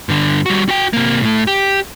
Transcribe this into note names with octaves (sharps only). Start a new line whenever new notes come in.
G2 D3
G3 F#4
F#4 G5
C3 A#3
A2 A3
G4